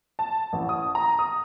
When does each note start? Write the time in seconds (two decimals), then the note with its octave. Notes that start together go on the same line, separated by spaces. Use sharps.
0.19 A5
0.53 A1
0.69 D#6
0.95 A#5
1.19 D#6